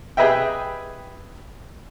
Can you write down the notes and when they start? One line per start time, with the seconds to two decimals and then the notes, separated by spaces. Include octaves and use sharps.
0.17 G4 G#4 B4 D#5 E5 G5